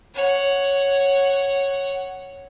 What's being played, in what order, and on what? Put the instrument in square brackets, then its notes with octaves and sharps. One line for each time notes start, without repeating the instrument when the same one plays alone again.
[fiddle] C#5 F#5